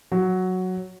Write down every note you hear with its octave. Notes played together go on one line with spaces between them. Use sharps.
F#3